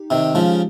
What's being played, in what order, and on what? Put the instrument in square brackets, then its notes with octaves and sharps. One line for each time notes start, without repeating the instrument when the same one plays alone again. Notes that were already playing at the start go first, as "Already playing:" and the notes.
Already playing: [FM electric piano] D#4 G4
[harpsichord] C3 D#3
[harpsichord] C#3 F3 [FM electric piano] G#3